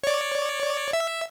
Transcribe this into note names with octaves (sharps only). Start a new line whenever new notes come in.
C#5 D5
E5